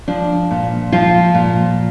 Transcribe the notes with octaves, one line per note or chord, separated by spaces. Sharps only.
F3 D4
A#2
F3 F4
A#2